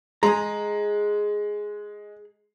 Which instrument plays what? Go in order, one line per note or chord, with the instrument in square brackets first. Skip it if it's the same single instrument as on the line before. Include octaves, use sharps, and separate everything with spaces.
[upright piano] G#3 [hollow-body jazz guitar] G#4 A#5